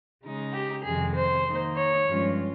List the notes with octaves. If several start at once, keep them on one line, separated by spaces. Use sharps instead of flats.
C#3 G#3 D#4
G4
F2 C3 D#3 G#3 G#4
C5
D#3 A#3 D#4
C#5
G2 F3 G#3 C#4 F4